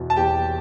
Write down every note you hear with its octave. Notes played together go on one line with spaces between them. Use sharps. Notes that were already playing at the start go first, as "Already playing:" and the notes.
Already playing: E2 B2
A5
E2 G4 G5